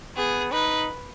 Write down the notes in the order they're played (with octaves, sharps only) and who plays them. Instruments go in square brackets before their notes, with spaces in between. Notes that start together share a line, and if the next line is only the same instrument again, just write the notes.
[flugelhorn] B3 [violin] G#4
[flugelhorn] D#4 [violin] B4